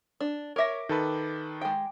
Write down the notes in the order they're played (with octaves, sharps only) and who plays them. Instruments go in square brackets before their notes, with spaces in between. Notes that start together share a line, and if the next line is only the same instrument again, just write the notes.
[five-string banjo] D4
[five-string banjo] A#4 E5 [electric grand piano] C#5 D6 A#6
[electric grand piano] D#3 A4 B4
[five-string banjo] G#3 G5